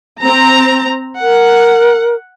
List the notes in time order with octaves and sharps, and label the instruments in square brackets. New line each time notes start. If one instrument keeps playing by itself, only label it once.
[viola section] C4 A#5
[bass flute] A#4 [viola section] F#5